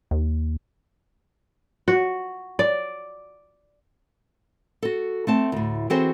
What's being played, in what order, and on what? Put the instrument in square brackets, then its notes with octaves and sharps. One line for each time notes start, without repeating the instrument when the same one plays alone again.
[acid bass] D#2
[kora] F#4
D5
[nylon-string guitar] F#4 A4
A3 C4 A5
D2 A2
E3 C4 F#4 G#4 A4 C5